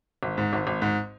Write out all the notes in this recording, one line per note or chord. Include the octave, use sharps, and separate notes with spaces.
G#1
G#2
G#1
G#1
G#2